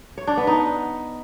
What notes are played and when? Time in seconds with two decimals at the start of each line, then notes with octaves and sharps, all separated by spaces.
0.18 C#5
0.27 D4
0.37 B3
0.47 D#4